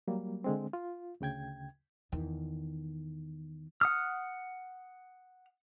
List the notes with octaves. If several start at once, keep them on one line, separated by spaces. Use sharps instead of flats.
F#3 G3 A#3
D3 G#3 C4
F4
D2 C#3 G5 G#6
E2 D#3
F#5 D#6 F6